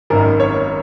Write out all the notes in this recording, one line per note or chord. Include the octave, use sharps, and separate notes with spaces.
G#1 F#2 D#3 A#4
C#5